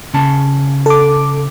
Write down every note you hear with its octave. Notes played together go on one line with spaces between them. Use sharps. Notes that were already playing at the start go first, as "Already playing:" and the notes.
C#3 C#4 A5
A4 D6